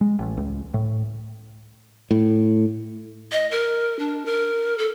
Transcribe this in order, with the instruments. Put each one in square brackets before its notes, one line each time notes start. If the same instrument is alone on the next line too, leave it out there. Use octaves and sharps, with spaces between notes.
[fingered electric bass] G#3
A1
C#2
A2
A2
[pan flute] D#5
A#4
D4
A#4
A4